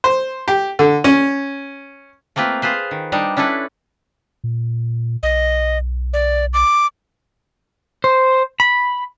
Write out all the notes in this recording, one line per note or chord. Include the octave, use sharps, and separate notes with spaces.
C5
G4
D3
C#4
A3 A#3 C4 F4 B4
F4 G#4 B4 C5
D#3
G3 D4 D#4
C#4 D4 E4 A4 B4
A#2
B1 D#5
D5
D6
C5
B5